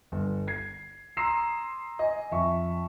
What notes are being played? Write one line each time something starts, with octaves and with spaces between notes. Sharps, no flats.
G1
G#6 C7
A#5 C6 D#6 E6 C7 E7
D#5 G#5
F2 E5 C#6